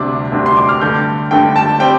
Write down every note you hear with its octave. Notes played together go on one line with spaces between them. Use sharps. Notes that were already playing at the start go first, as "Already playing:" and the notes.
Already playing: D2 C3 G3 D4
D2 C3 G3 D4
C6
D6
F6
G2 D3 A3 G6
G2 D3 A3 G5
A5
G3 C4 G5